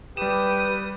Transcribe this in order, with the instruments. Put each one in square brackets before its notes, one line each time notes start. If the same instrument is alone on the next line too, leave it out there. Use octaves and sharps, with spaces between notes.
[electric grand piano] G3 E7 [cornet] G4 [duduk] B4 [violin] D#6